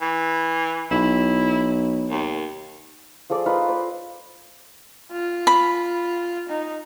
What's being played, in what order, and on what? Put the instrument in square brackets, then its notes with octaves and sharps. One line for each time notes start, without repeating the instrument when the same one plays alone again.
[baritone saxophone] E3
[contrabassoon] B1 [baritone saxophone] E4
[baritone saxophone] D#2
[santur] F3 G#4 A4 D5
D#4 F4 B4
C5 D5
[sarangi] F4
[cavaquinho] B5
[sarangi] D#4